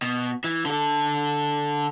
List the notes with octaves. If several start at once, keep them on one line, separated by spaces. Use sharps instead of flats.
B2
E3
D3 A4